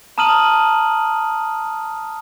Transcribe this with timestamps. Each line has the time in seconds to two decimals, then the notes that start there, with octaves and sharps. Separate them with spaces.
0.18 A5 A#5 D#6 F6 D#7 F#7